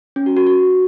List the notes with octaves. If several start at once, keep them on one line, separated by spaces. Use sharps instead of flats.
C#4
F#4
F#4
F#4